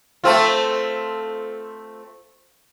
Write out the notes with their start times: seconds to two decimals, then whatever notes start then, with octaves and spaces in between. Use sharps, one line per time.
0.24 A3 C4 F4